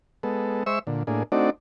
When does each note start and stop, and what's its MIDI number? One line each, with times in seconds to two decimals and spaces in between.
0.23 0.63 56
0.23 0.63 59
0.23 0.63 69
0.66 0.79 56
0.66 0.79 72
0.66 0.79 76
0.66 0.79 85
0.66 0.79 88
0.87 1.03 46
0.87 1.03 50
1.07 1.23 45
1.07 1.23 58
1.07 1.23 62
1.07 1.23 68
1.32 1.50 57
1.32 1.50 60
1.32 1.50 62
1.32 1.50 63
1.32 1.50 66
1.32 1.50 74